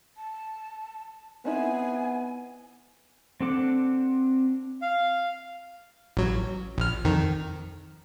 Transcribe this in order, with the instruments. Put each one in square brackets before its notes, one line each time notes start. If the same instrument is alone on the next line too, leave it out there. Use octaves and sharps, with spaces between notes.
[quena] A5
[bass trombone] B3 [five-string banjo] C4 D#4 E4 [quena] G#5
[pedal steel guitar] C4 D4 A4 F#5 D6
[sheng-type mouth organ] F5
[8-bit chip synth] A1 F#3
A#1 F6
F2 D#3